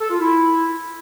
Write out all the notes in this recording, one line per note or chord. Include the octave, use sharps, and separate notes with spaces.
A4
F4
E4